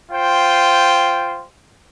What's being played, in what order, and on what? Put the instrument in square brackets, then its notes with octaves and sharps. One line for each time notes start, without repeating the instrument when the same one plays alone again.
[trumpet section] F4 C5 G5